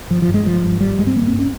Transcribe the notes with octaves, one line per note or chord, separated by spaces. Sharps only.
G1 F3
F3
G2
G#3
G1 F3
G2
G#1 G3
G2 G#3
C4
G#1 A#3
G2 C4
C#4